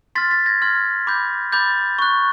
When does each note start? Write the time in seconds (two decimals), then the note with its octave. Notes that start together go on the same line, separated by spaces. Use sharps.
0.15 C6 F6 A6 B6
0.31 A6 B6
0.46 G#6 A#6
0.62 C6 F6 G#6
1.07 B5 D6 G6
1.52 B5 D6 G6 A6
1.99 C#6 F#6